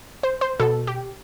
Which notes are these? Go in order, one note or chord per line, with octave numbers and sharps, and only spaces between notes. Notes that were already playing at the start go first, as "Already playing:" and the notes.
C5
C5
B2 A4
G4